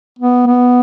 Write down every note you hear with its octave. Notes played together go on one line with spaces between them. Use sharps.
B3
B3